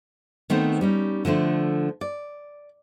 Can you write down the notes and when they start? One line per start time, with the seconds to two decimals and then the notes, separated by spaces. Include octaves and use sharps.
0.50 D#3 A3 B3 C4 C5
0.81 G3 C#4 D#4
1.25 D3 F3 A3 D4
2.01 D5